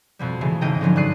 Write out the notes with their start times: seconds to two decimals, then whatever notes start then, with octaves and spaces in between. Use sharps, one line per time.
0.19 F2 B2 G3
0.41 C#3 E3 G#3 A3
0.61 G#1 D#5 G5 A#5
0.81 D3 F3 F#3 C#4
0.96 G2 D5 F#6 C7 D#7